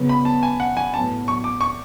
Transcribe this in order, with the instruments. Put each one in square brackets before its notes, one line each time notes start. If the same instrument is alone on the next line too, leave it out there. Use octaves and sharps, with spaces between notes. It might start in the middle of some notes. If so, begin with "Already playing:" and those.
Already playing: [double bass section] C#3 F#3 B3
[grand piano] B5
A5
G#5
F#5
G#5
[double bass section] A2 F#3 B3 [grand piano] A5
[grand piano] C#6
D6
C#6